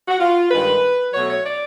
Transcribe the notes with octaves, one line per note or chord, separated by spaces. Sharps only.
F#4
F4
G2 D#3 G#3 B4
B2 F#3 A3 C#5
C#5
D5